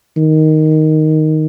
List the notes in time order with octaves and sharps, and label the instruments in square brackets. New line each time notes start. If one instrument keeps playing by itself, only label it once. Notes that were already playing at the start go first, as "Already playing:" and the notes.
[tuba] D#3